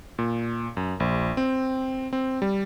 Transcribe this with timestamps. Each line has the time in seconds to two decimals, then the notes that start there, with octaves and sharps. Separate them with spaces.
0.19 A#2
0.77 F#2
1.00 A#1
1.37 C4
2.13 C4
2.42 G3